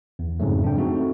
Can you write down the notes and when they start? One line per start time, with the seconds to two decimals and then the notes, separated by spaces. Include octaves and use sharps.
0.19 E2
0.40 F2 G#2 C#3 F#3 A3
0.64 D4 G5
0.77 G#3 A3 C4 D#4 F#4